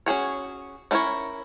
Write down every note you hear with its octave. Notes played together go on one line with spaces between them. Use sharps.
C#4 F#4 G#4 C#5
C#4 D4 E4 A#4 C#5